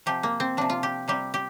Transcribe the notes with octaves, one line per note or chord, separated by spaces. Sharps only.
C3 F3 G4
A#3
C4
C3 F3 D4
F4
G4
C3 G3 G4
G4